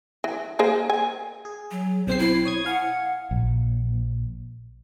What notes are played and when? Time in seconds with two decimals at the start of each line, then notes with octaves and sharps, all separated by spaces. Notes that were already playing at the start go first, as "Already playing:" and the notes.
0.24 E3
0.59 A#3 G#4 C5
0.90 G#5
1.45 G#4
1.71 F#3
2.07 B1 C4 C5 C7
2.19 E4
2.45 C#5 D#6 G#6
2.66 F5 F#5 G#5
3.31 A#1